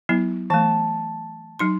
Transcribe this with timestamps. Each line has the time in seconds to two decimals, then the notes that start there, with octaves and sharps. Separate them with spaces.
0.09 F#3 B3 E4
0.50 E3 A3 A5
1.59 F#3 D#4 C6